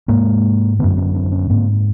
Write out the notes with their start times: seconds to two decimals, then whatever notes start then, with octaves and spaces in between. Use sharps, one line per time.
0.08 G#2 G#3 A#3
0.79 F#2 D3 A3 B3
0.97 B3 C#4
1.15 C4 D4
1.32 B3 C#4
1.50 G#2 A#3 C4